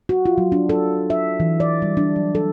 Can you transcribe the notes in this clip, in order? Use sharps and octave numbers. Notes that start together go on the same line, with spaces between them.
F#4
F4
F#3
D4
A4
E5
E3
D5
G3
D4
F#3
A4